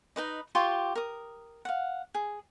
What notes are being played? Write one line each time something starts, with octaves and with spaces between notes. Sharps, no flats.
D#4 B4 D#5
F4 G4 C6 C#6
A#4 D#6
F5 F#5
G#4